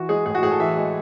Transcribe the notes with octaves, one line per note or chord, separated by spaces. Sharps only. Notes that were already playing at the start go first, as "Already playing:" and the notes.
Already playing: E3 F#4
G#3 G#4
A2 G#4
F#4
A2 G#4
A4
E3 E5
G#3